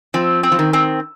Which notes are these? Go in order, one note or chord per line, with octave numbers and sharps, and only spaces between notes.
F3 C4
C4
F3
D#3
C4